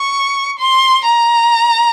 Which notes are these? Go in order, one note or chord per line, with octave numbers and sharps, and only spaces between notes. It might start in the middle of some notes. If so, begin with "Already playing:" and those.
Already playing: C#6
C6
A#5